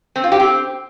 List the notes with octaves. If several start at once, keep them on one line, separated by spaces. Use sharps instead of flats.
C4
F4
G4
C4